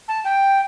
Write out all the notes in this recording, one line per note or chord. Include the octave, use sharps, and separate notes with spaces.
A5
G5